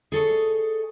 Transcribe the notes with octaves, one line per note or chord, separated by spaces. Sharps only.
G#4 A4 C#5 D#5